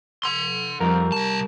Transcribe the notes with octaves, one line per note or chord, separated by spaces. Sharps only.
F#5 C6
F2 G3 A#4
C2 A5